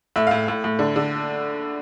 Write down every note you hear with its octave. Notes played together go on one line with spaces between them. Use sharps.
A2 E5
A2 F5
A2
A2
D3
D3